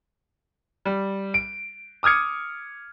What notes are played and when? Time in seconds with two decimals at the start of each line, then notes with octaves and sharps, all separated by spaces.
0.85 G3
1.34 D7
2.03 D6 D#6 F6 G#6 C#7